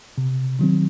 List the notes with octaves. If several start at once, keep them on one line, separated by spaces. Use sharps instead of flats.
C3
D#3 F#3 C4